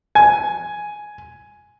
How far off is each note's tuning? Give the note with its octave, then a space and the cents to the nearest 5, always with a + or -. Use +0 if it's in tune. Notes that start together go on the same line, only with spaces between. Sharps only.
G#5 +5